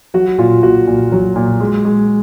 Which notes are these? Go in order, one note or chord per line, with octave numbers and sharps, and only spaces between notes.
F#3 F#4
A#2 F4
A#2 F#4
A#2
F#3
A#2
G#3
G#3